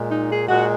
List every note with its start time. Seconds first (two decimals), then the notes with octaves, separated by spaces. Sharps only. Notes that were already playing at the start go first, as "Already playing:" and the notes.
Already playing: A#2 G#3
0.09 D#4
0.29 G#4
0.48 A#2 G#3 F#4